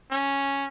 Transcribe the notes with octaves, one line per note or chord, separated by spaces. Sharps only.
C#4